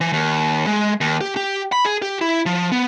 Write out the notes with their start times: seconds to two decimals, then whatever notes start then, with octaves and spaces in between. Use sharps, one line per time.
0.01 E3
0.13 D#2
0.67 G#3
1.01 D#2
1.21 G4
1.37 G4
1.72 B5
1.85 G#4
2.02 G4
2.21 E4
2.46 F3
2.72 B3